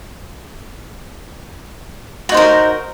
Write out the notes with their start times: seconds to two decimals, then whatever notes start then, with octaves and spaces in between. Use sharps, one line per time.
2.29 F#4
2.32 D#4
2.34 C5
2.37 A#4